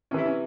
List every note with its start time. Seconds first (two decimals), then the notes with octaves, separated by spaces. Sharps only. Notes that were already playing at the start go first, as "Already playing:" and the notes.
0.11 C3 C#4
0.14 E3 E4
0.26 C#4